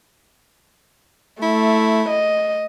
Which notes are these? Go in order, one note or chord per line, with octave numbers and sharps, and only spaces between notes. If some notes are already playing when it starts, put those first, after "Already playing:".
A3 E4
D#5